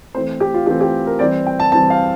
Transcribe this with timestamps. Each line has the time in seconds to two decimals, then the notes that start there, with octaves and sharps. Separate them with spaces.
0.15 E3 A3 C4 C5
0.40 G4
0.54 F4
0.67 E3 A3 C4 G4
0.81 G4
1.06 A#4
1.19 E3 G3 C4 D5
1.47 G5
1.60 A5
1.72 E3 G3 C4 A5
1.90 F5